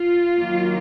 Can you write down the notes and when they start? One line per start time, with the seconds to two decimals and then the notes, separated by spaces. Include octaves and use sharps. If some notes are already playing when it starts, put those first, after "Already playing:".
Already playing: F4
0.37 D#3 F#3 A#3